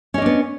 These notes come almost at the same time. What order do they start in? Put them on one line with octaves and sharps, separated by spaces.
C#4 D#5 D4 B3